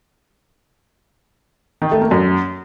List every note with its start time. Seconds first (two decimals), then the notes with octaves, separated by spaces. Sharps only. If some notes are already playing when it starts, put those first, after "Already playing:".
1.82 D#3
1.91 A3
2.01 A#3
2.11 F#2